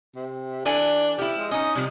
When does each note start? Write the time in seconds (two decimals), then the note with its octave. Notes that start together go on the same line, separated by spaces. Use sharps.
0.16 C3
0.65 E3 D4 A4 G#5
1.18 F3 E4 G4
1.38 G#3
1.51 C#4 D#4 D#5
1.75 C3 F3 G3